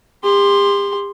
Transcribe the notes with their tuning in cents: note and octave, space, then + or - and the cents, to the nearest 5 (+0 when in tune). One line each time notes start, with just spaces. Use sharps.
G4 +40 C6 +0